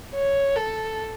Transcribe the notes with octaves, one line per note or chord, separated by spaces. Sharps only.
C#5
A4